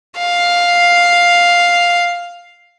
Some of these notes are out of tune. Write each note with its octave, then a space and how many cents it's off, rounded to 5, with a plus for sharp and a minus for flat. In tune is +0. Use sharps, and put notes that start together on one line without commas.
F5 +5